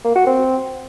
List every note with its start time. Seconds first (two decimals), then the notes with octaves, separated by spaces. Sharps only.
0.05 A#3
0.16 F#4
0.27 C4